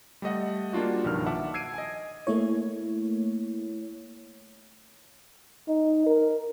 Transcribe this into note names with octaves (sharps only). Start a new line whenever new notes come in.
G3 A3 D#5 F#5
G3 A#3 D4 F4 F#4
B1 G2 D#3 F3 F6
E5 F#5 A5 D6
E6 G#6 C7 D7 D#7
D#5 G#5
A3 A#3 E4 C#5
D#4
A#4